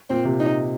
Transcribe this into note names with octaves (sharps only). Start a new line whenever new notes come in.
A#2 C4
C3
D#4